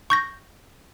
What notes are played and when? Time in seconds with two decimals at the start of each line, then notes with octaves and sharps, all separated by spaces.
0.10 C#6 G6 A#6